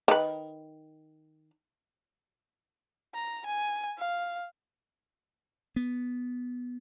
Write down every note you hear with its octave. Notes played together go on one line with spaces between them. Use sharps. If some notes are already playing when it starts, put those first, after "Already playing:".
D#3 B4
A#5
G#5
F5
B3